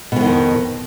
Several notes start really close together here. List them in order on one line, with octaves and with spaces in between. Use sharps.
B2 E3 D#3 F2